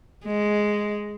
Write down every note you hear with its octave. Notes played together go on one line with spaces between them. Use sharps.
G#3